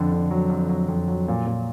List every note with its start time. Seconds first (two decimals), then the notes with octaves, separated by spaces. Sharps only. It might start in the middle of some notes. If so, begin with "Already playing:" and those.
Already playing: F2 D3
0.12 D3
0.31 F#3
0.50 F2
0.69 F#3
0.88 F2
1.08 F#3
1.28 A#2
1.47 A#2